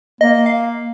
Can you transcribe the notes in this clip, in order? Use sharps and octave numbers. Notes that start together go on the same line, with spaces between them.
A#3 D#5
F5